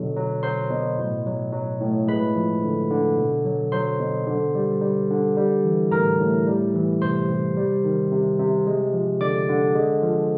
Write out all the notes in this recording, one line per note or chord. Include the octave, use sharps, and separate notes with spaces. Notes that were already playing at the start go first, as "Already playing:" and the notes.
Already playing: B2 D3 F#3
F#3
F#3 C5 C6
B2
A2
F#3
F#3
A2
G#3 B4 B5
F3
D3
D3
B2
F#3
F#3 C5 C6
B2
D3
G3
G3
D3
G3
E3
A2 A#4 A#5
A2
G3
E3
C3 C5 C6
C3
G3
D#3
C3
C3
G#3
F3
D3 D5 D6
D3
G#3
F3